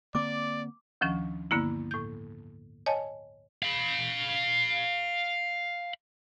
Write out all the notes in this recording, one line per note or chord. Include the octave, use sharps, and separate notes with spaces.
D3 A#3 C4 D5 D6
D2 D#3 F3 C#4
G2 D3 A#3 B3 E4
A2 G6
C#5 D#5 G#5 A5
F5 B5